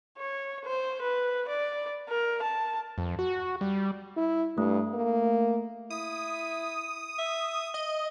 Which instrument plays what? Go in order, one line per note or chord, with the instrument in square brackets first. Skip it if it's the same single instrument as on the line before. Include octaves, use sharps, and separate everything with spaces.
[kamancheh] C#5
C5
B4
D5
A#4
A5
[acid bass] F2
F#4
G3
[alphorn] E4
[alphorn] G2 [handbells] A3
[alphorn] A#3
[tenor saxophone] E4 [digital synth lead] D#6
[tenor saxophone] E5
[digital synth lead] D#5